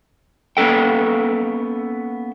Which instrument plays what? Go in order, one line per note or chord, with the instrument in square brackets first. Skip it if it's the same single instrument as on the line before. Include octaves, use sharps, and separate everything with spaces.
[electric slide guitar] A#3 B3 C#4 A4 G5